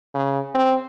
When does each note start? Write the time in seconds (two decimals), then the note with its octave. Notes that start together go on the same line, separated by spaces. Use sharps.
0.14 C#3
0.55 C4